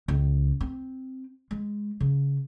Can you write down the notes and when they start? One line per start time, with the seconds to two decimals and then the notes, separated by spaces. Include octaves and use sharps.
0.08 C#2
0.61 C4
1.51 G#3
2.00 C#3